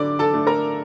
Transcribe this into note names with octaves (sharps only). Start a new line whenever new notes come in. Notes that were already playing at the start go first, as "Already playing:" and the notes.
Already playing: D3 D4 D5 D6
A4 A5
A3 D4
A#4 A#5